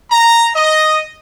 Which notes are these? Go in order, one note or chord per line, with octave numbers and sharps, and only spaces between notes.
A#5
D#5